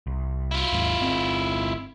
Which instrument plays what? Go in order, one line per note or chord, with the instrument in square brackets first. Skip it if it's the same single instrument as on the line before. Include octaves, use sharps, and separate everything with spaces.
[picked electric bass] C2
[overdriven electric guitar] E4 F4
[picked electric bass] D#2 G#2
G1 C4